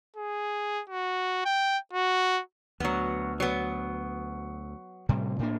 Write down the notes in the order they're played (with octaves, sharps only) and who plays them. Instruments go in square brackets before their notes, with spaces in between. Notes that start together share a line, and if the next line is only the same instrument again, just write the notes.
[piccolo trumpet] G#4
F#4
G5
F#4
[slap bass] D2 [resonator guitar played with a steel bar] F#3 B3
[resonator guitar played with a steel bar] F#3 B3
[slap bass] A2 C3 G3
A2 A#3 D4